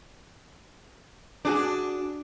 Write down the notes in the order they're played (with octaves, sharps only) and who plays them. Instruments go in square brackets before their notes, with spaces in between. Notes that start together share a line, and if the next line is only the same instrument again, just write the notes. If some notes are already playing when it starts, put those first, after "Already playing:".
[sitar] D4 [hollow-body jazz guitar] F#4 G#4 D5